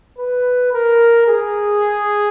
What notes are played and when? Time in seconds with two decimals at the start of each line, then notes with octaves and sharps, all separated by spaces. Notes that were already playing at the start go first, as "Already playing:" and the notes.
0.18 B4
0.73 A#4
1.28 G#4